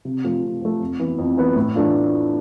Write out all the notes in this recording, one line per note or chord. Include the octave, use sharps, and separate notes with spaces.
C3
F3 A3
C3
F3 A3
F2
E3 B3
F2
E3 B3
A2
E3 A3 D4 F4